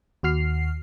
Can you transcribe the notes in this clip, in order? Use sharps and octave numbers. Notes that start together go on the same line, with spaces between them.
D#2 F#4 F6 C7